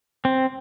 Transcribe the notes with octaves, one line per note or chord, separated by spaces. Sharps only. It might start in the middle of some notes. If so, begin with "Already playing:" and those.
C4